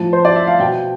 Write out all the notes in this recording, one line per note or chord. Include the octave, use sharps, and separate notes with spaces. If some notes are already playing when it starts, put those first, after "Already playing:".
Already playing: A2 F3 A5
C5
D5
E5
F5
B2 G5